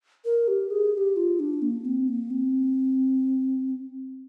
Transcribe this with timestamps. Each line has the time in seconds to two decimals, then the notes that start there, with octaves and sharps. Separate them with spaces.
0.25 A#4
0.48 G4
0.71 G#4
0.94 G#4
0.98 G4
1.16 F4
1.40 D4
1.62 A#3
1.85 C4
2.08 A#3
2.30 C4